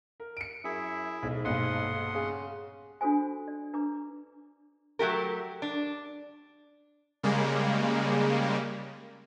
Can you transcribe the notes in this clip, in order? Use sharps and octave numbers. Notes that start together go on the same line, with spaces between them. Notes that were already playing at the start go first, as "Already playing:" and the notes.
A#4
C#7 D7
F#2 E4 G#4 E5
B1 G#2
B1 G2 A#2 F#5 C6 D#6
C#3
D4 F4 F#4 A4 C5 G#5
D5
D4 B4 A#5 D6
F#3 A3 G4 A#4
D4
C#3 G3 G#3 A#3